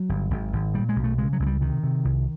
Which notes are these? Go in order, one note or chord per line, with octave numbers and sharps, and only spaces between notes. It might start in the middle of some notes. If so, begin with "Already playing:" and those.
Already playing: F#3
G1
G#1
G#1
A#2 G3
G#3
B1
A3
C#3 G#3
F#3
C#2 G#3
G3
C3 D#3
C3
C2